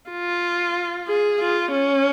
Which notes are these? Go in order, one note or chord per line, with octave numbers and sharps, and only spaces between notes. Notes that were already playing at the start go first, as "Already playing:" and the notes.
F4
G#4
F4
C#4